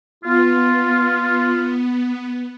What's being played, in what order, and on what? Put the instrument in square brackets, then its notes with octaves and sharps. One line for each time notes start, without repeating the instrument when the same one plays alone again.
[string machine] B3 [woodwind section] F4